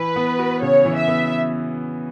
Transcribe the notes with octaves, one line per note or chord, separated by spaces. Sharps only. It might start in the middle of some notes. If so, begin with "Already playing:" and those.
Already playing: E3 B4
B3
F#4
C#3 C#5
E3
E5
B3